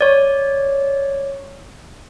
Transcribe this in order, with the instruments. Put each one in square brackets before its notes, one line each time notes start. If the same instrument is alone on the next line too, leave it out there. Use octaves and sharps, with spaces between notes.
[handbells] C#5 D5